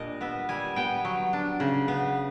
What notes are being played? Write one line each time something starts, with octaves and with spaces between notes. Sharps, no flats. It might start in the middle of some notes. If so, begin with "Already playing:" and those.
Already playing: A#2 G3 D4 D#5
B3 E5
G3 G#5
B3 G5
F#3
D4
C#3
B3